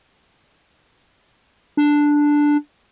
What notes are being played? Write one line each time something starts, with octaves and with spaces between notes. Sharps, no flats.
D4